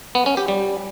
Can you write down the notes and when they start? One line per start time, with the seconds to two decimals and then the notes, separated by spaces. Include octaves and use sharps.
0.15 B3
0.26 C#4
0.37 G4
0.48 G3